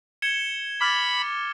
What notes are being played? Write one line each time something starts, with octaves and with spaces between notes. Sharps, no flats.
G#6 C#7 E7 G7
B5 D6 F6 A6